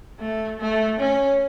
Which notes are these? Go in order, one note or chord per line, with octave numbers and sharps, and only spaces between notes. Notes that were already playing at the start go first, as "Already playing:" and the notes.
A3
A3
C#4